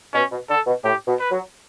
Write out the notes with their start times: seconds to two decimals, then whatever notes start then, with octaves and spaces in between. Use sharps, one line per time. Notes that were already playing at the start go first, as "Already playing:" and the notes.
0.14 B2 C#4
0.32 B2
0.50 D3 A4
0.67 B2
0.84 A2 G4
1.08 B2
1.20 B4
1.31 F#3